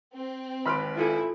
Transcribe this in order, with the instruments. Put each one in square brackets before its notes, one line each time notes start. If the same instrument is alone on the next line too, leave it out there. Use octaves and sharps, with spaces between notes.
[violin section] C4
[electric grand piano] G#1 B4 D7 [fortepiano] B5 C6 F6
[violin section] E4 [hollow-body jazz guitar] F4 A4 G#5